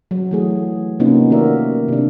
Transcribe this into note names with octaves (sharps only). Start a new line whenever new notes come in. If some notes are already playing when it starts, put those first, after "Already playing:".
F#3
E3 A3 G#4
C3 A#3 B3 C#4 D#4 F4
D#3 A3 F#4 A#4 D5 E5
C3 D4